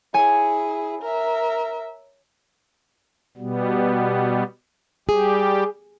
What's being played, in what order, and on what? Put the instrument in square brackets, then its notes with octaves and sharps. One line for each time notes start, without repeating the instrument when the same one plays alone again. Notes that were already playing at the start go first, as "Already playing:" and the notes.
[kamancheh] E4 G#4 [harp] C#5 G#5
[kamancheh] A#4 E5
[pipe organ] B2 G3 B3
[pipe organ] G3 G4 [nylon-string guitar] G#4